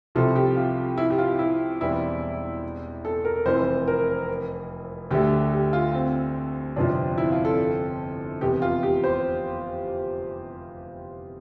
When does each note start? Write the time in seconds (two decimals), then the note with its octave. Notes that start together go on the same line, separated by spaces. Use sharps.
0.15 C2 C3 F3 A4
0.36 G4
0.57 F4
0.98 E4
1.10 G4
1.18 F4
1.39 E4
1.81 E1 E2 E3 G3 C4 E4
3.05 A4
3.25 A#4
3.46 F1 F2 E3 C5
3.88 A#4
5.11 D2 D3 A3 G4
5.52 G4
5.73 F4
5.94 C4
6.76 G1 F2 C3 F3 D4
7.18 E4
7.32 F4
7.45 A4
8.41 F1 E2 C3 G4
8.62 F4
8.83 G4
9.04 C5